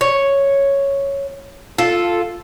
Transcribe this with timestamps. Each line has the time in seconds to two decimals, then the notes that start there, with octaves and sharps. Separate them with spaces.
0.01 C#5
1.78 F4 A4